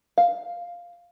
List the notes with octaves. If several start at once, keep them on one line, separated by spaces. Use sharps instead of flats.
F5